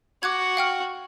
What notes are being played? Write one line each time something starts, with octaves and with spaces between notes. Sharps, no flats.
F#4 D6 F#6 G#6
F5 G5 F6